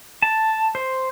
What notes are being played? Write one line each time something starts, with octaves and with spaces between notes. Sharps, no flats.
A5
C5